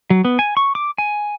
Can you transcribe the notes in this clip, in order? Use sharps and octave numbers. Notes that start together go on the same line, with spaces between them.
F#3
B3
G#5
C#6
D6
G#5